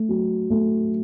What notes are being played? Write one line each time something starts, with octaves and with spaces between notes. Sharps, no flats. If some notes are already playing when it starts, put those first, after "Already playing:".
Already playing: A3
F#3
A3